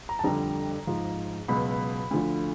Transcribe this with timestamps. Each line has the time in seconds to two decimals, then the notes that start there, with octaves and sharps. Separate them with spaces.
0.09 A#5
0.19 A5
0.24 F2 D3 G3 A#5
0.87 G#2 F3
1.48 C#2 B2 F#3 B5
2.11 D2 D3 F3